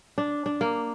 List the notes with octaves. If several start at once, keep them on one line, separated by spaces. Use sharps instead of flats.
D4
D4
A#3